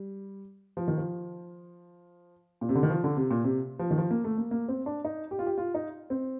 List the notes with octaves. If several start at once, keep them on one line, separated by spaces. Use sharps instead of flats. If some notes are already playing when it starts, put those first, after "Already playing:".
Already playing: G3
F3
D#3
F3
A#2
C3
D3
D#3
F3
D3
C3
A#2
C3
F3
D#3
F3
A#3
A3
A#3
A#3
C4
D4
D#4
G4
F4
G4
F4
D#4
C4